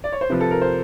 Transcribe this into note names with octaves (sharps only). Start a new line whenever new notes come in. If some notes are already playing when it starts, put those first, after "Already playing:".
D5
C#5
C5
C3 F3 B4
A4
A#4
C5